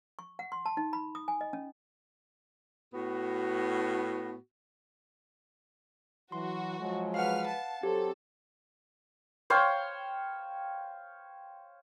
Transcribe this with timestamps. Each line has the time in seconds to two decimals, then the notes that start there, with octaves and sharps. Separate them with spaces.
0.19 C#6
0.39 F#5
0.52 C6
0.66 A5
0.77 D#4
0.93 B5
1.15 D#6
1.28 G#5
1.41 D#5
1.53 C#4
2.93 A2 B3 F#4
6.32 E3 F#3 F#4 C6
6.80 F3 F#3 G#3
7.14 B4 F5 F#5 F6
7.49 A5
7.83 F#3 C4 G4 A4
9.50 C5 C#5 F5 G5